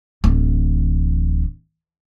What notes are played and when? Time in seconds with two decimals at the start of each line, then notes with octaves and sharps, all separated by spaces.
0.24 D1 E3